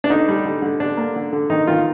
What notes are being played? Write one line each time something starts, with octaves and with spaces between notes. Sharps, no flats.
D4
D3 D#4
G3
D3
D3
D3 D4
A#3
D3
D3
D#3 D#4
D#3 F4